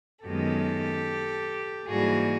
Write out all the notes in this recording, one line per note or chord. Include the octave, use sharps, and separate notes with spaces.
F#2 D#3 G#3 B3 G4 A4
G#2 E3 G3 A#3 F#4 G#4